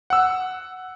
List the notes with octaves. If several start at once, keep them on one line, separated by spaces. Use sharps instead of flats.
F#5 E6